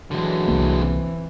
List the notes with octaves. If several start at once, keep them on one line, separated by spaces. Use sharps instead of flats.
D3 E3 F#3 G#3
C2 A#3
C4